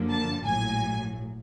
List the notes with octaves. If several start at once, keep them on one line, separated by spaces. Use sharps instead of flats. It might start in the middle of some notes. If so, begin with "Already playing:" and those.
Already playing: F#2 D3 F3 A#3
A5
A#1 A2 F#3 G#5